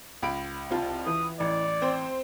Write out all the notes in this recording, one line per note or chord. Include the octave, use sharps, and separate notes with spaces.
C#2 B5 D7
C2 F4 A5
E3 D#6
A1 D5
C4 C5